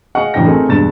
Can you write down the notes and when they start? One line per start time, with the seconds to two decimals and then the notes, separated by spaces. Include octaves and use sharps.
0.15 G#4 D#5 F5 F#5 C#6
0.34 A1 F#2 E3 D4 G5 A#6
0.45 A3 C4 D#4 F4 G#4 A#4
0.68 E1 G2 G#3 A6 E7